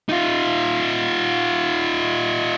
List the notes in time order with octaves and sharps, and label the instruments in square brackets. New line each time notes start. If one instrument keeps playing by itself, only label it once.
[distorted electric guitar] D#4 F4